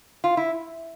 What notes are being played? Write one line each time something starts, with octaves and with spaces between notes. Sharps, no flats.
F4
E4